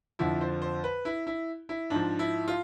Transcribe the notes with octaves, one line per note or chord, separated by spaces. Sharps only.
F2 D3 F3 E4
C5
C5
B4
E4
E4
E4
G#2 F3 D4
E4
F4